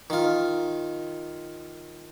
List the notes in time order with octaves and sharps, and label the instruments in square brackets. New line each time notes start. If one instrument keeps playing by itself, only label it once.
[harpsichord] D#3 F4